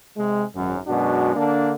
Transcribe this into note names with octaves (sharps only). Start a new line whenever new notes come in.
C3 G#3
G#1 F#2
F#2 B2 G#3 D4 F#4
D3 A#3 D4